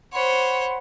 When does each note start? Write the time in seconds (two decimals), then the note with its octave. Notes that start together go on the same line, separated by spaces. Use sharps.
0.13 C5 C#5 F#5 B5 C6